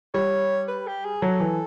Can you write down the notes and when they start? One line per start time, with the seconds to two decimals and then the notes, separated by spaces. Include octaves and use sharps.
0.14 G3 C#5
0.68 B4
0.87 G4
1.05 G#4
1.22 F#3 A4
1.40 E3